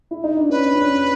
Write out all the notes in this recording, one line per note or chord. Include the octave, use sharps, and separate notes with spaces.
E4
D#4
D4
C#4 B4
D4
C#4